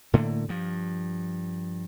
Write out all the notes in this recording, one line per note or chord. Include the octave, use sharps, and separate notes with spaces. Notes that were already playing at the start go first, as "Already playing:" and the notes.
A2 D3 A3 A#3
G2 F3